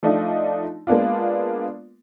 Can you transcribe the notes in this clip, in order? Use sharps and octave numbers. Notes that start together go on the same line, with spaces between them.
F3 A3 D4 D#4 F4 D#5
G#3 A#3 B3 D4 F4